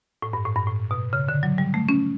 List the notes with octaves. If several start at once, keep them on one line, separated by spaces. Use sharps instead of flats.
A2
G2
A2
G2
A2
B2
C#3
D3
F#3
G3
A3
C#4